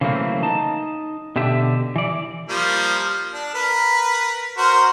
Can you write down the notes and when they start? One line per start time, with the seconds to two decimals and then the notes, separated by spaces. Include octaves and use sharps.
0.01 C#3 E3 F#3 A3 A#3 C4
0.43 D#4 A5
1.36 B2 D3 G4 E5
1.96 E3 D5
2.49 F3 G3 A#3
3.33 D4
3.55 A#4 B4
4.58 F#4 A#4 C5